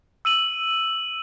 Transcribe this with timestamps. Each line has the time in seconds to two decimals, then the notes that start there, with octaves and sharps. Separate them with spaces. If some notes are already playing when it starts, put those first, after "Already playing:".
0.25 E6 D#7 F#7